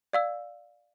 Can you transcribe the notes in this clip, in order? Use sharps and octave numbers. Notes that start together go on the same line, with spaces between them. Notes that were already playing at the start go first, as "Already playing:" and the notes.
D5 F5 E6